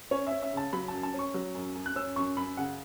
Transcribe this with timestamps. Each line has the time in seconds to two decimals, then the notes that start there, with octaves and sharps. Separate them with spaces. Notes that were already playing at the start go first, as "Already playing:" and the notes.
0.11 C#4 C#5
0.27 E5
0.32 C#4
0.42 E5
0.53 C#3 A5
0.73 F#3 B5
0.88 A5
0.93 F#2
1.03 A5
1.14 C#4 C#6
1.34 F#3
1.55 F#2
1.75 F#2
1.86 F#6
1.96 C#4 E6
2.16 F#2 C#6
2.37 F#2 B5
2.57 C#3 F#5